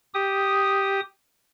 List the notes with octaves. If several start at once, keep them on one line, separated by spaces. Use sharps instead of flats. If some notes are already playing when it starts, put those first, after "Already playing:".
G4 D#6